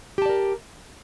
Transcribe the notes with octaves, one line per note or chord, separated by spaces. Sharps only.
G4 A#4 D5 A5